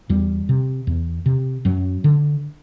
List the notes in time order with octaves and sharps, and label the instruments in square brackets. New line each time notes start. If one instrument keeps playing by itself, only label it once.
[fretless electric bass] E2 G3
C3
E2
C3
F#2 F#3
D3